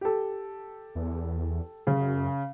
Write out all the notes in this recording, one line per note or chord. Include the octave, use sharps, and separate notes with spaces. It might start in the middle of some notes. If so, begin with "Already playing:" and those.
G4 A4
E2
F#2 C#3